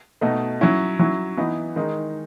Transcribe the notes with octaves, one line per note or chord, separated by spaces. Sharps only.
B2 A3 D#4
F#3 C#4 E4
F#3 C#4 E4
E3 B3 D#4
D#3 G#3 D#4